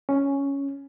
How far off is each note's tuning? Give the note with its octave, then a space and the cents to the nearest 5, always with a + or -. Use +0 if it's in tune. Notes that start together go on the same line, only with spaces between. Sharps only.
C#4 +5